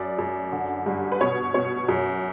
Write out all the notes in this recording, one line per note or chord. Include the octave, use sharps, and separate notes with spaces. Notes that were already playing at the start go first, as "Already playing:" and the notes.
Already playing: F#2 D5
F#2
D3
G2
B4
B2 C#5
B2 C#5
F#2